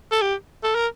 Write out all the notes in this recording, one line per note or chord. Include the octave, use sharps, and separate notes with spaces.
A4
G4
A4
A#4